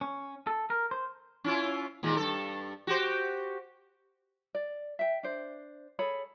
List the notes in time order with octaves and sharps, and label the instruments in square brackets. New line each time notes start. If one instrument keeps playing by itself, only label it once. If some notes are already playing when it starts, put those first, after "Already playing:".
[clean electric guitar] C#4
A4
A#4
C5
[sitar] C#4 E4 F4
D#2 A#2 G#3
G2 A4
F#4 G4 C5
[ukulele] D5
E5 G5
D4 C5
G#4 A4 C#5 B5